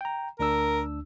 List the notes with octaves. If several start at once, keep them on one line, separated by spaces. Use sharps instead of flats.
G5 A#5
D2 D4 A#4 E6